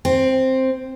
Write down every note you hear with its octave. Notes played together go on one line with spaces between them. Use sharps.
C4